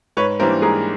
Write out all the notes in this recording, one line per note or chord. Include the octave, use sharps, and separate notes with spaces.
G#2 B4 C#5
E3 G3 A#3 D4 A#4 C5
G#2 G#4 A#4